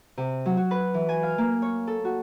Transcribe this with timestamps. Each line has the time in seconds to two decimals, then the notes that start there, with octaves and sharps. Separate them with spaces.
0.17 C3
0.46 F#3
0.57 F#4
0.71 B4
0.94 E3
1.09 G#5
1.23 F5
1.38 A#3
1.62 C#5
1.87 A4
2.05 F#4